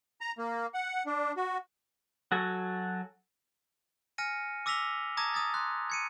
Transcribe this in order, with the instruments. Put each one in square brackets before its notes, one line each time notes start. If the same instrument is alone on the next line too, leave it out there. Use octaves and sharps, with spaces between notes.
[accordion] A#5
A#3
F#5
D4
F#4
[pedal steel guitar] F#3 F#4 A4 G#5
[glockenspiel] G#5 F6 A#6 C#7 D#7
D6 E6 A#6 B6 F7 G7
A5 A#5 D6 D#6 G#6 A#6
D#6 G#6 A6
C6 F#6
G#6 C#7 D#7